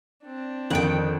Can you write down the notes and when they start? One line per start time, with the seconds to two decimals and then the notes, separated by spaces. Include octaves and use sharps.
0.25 C4 D4
0.70 F2 D3 D#3 F#5 G5 D7